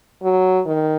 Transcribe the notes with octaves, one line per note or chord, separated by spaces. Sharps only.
F#3
D#3